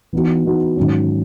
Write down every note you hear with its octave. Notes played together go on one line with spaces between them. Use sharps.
E3 B3 D#4 F#4
E3 B3 D#4 F#4
G#2 D#3 F#3 C#4